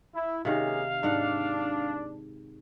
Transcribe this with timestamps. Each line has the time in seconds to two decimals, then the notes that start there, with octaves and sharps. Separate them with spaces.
0.15 E4
0.45 C3 D#3 A#3 C#4 G#4 F5
1.03 G#2 D4 A#4 F#5